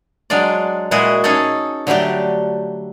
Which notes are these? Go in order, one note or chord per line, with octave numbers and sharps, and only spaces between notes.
F#3 G#3 D4 F4 D5
A#2 G#3 E4 F#4 G#4
C#4 D#4 G#4 A4
D3 F#3 G3 A3 G4